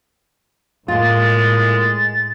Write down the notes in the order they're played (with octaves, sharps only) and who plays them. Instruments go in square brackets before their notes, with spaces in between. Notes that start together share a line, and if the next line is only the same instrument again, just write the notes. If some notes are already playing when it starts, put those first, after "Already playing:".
[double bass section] A2 [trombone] G#3 [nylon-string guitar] A#3 F4 [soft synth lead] A6